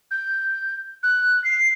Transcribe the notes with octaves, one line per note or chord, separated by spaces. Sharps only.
G6
F#6
C7